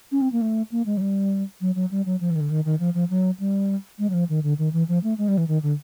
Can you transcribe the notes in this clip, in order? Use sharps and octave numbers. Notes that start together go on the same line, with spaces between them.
C#4
C4
A#3
A3
A#3
G#3
F#3
G3
F#3
F#3
G3
F#3
F3
E3
D#3
D3
D#3
D#3
F3
F3
F#3
G3
G#3
F#3
F3
D#3
D3
D#3
E3
F3
A3
G#3
G3
E3
D#3
D3